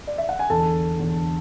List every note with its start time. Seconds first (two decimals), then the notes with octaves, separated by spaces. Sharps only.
0.07 D5
0.18 E5
0.29 F#5
0.39 G#5
0.50 E2 D3 A4 A5
0.99 E2 D3